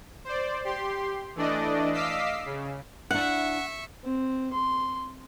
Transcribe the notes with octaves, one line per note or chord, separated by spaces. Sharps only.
C5 D5
G4 C6
E3 A3 D4 D5 D#5
D#5 F5 D6 E6 B6 C7
C#3
D4 E4 E5 F#5 C#6
C4
C6